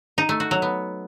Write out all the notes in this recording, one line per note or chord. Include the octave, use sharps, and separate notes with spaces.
D#4
A3
F#4
F#3
B3